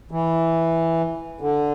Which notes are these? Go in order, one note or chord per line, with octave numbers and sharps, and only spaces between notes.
E3
D3